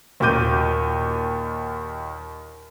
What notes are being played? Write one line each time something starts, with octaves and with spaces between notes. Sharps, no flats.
D#2 A#2 F#4 D6 G6 D#7